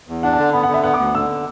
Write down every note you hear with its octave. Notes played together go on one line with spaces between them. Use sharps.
E2
D4 F#5
A5
D3
B3 B5
F#5
D3 E5
B3 F#5
D6
D2
D3 E6